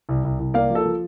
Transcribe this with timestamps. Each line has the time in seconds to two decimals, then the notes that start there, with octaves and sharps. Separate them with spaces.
0.09 C2
0.24 C2
0.39 C2
0.54 A#3 D5 F5
0.70 F3
0.75 A4
0.85 F3